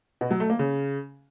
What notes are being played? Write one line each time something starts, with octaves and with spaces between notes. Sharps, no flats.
B2
F#3
A3
A#3
C#3